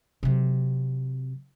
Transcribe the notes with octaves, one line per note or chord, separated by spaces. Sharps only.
C3 F#3